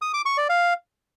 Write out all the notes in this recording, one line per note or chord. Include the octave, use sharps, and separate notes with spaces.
D#6
D6
C#6
D5
F5